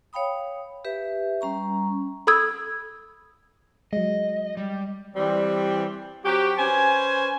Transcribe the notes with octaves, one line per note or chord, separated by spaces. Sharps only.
C#5 F5 G5 B5 D#6
G4 B4 E5
G3 C#4 A#5 C#6
A4 B5 D#6 E6 G#6
F#3 G#3 D#5
G3
E3 G3 C4
F#3 C4 F#4 G4
C#4 B4 C5 G#5